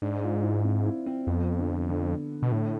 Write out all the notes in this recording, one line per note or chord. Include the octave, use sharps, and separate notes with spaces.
G#2 D4
F4
E4
C4
E4
C4
F2 B3
D3
D3
B2
A2 D3